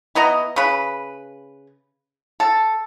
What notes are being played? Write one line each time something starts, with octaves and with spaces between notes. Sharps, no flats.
E3 B3 D#5 A#5
C#3 B4
A4